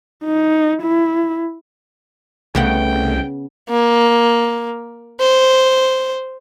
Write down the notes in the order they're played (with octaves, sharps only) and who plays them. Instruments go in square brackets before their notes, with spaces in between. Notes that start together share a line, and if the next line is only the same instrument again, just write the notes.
[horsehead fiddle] D#4
E4
[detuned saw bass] C2 [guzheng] C#3 B3 F#5 [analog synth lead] A3 [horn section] G5
[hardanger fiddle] A#3
C5